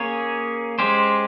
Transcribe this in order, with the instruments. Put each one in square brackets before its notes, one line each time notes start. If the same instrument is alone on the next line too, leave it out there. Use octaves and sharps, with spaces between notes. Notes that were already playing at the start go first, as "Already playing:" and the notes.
Already playing: [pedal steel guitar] A#3 C#4 G#4 C#5
G#3 C#4 G4 C5